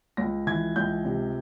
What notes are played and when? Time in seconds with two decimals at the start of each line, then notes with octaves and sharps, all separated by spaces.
0.17 C#2 A#6
0.47 E3 G#6
0.76 C#2 G6
1.05 C3